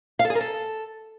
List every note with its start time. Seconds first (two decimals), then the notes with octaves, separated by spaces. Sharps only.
0.19 F5
0.25 A4
0.30 G#4
0.35 A#4
0.41 A4